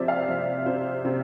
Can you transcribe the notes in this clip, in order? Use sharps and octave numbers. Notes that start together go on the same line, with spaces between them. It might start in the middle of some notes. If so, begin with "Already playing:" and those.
Already playing: C3 F3 C5 D5 E5
F5
F3 E5
C3 C5
C3